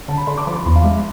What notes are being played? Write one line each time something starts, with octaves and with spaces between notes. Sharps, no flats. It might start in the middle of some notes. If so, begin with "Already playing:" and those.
D3 A5
B5
D3 C6
D6
F3 C6
D6
E2 C6
F5
G#3 E5